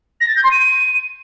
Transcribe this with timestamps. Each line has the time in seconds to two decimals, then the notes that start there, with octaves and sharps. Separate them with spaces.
0.21 A#6
0.28 A6
0.36 G6
0.44 C6
0.51 D#7